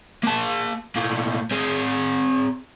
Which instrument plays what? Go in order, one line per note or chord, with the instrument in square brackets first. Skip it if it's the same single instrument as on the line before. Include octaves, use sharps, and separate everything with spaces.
[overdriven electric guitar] A#3 A5
A2 A#3
C4 G#4